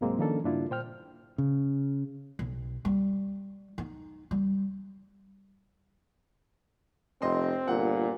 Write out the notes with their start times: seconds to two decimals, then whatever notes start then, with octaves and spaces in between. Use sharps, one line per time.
0.01 C2 G#2 F#3 G#3 A#3 C4
0.19 D#3 F3 A#3 C#4 D4 A4
0.44 G2 C#3 A#3 D4 E4 F4
0.70 A#2 C5 G5 F6
1.38 C#3
2.39 B1
2.85 G3
3.78 D#4
4.31 G3
7.22 F1 C4 D#5 C6
7.68 G1 A#2 F#5